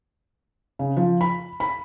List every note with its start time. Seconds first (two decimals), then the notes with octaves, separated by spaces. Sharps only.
0.79 C#3
0.97 F3
1.21 B5
1.60 B5